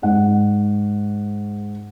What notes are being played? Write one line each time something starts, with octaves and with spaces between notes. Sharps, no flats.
G#2 F#5